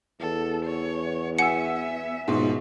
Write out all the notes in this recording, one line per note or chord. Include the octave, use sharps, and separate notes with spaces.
E2 A4
C#5
B3 E5 F#5 G#5 E6 C#7
C#2 G#2 B2 F3